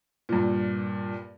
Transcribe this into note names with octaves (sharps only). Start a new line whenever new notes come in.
G2 A#2